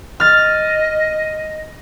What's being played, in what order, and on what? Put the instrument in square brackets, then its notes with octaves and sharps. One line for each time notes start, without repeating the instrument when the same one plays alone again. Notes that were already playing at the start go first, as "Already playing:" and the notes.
[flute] D#5 [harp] F6 A6